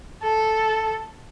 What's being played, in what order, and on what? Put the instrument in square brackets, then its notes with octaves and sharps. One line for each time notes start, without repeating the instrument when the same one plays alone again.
[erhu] A4